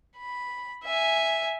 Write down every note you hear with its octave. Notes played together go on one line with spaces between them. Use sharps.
B5
E5 G#5